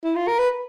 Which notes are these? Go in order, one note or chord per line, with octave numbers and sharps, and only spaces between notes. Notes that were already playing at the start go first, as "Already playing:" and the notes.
E4
F4
A#4
B4